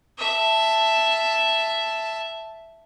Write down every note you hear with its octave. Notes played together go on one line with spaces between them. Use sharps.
E5 A5